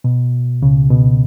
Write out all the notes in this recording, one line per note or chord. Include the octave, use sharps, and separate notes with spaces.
B2
C#2 C#3
B2